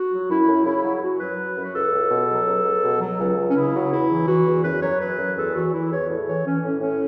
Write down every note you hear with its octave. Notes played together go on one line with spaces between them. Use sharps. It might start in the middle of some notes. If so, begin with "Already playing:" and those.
Already playing: F#4
F#3
F#2 E4
F#2
C#3 E4
F#3
F#2 F#4
F#3 B4
F#3
F#2
F#4
C#2 A4
C#2
B2
F#3
C#2
C#2
B2
F#3
C#2
C#2
C#4
C#3 E4
F#3
E2 E4
E3
E3 F#4
E2
F#2 B4
F#3 C#5
F#3 B4
F#2
E2 A4
E3 F#4
E3 E4
E2 C#5
A2
E3 C#5
E3 C#4
A2 C#4
A2 C#4